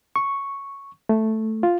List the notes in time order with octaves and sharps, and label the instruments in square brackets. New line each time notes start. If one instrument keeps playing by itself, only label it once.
[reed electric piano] C#6
A3
F4